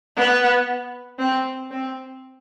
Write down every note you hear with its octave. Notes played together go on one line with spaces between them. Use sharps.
B3
C4
C4